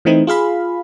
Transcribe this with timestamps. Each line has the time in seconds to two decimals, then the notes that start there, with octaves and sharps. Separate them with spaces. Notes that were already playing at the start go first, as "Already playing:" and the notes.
0.05 E3 A3 C4 D#4 E4
0.27 F4 G#4 F5 B5